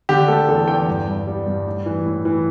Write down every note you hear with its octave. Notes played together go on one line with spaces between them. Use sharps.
D3 G4
A3 A4
E2 A4
E2 G5
G2
G2
G3
G2
A2
E3
A2
E3